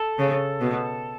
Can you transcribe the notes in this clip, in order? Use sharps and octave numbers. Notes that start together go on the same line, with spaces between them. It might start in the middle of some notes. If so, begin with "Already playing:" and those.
Already playing: A4
C#3
B2